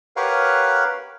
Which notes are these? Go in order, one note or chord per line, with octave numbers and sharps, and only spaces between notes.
G4 A#4 B4 C#5 F5 F#5